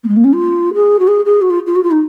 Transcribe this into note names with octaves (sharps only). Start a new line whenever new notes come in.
A#3
G#3
A#3
C#4
F4
G#4
F#4
G#4
G#4
F#4
F4
F4
F#4
F4
D#4